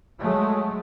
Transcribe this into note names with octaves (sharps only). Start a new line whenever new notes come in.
F#3 G#3 A3